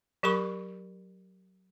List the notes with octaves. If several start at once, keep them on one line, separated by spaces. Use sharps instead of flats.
F#3 G4 A#4 B5 C#6